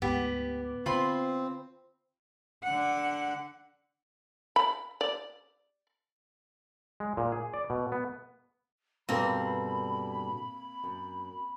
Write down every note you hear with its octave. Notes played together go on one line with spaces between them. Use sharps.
D2 G#2 B3 G4
D3 C4 F4 B5 C6
D3 F#5
B5
D5
G#3
A#2
G#4
D5
B2
B3
G2 B2 D3 A#3 C4 B5
F#2